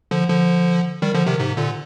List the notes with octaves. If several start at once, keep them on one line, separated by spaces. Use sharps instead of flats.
D3 F3
D3 F3
D#3 G3
D3 F3
C3 D#3
G#2 C3
A#2 D3